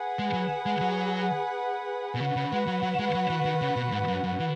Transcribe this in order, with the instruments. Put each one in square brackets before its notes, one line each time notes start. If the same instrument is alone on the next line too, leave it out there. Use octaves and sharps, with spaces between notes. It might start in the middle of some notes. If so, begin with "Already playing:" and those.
Already playing: [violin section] G#4 B4 F#5
[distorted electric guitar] G#3
F#3
G#3
F#3
B2
[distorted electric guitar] C#3 [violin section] F#4 B4 F#5
[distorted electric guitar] C#3
G#3
F#3
F#3
G#3
F#3
E3
D#3
C#3
B2
G#2
F#2
F#2
E3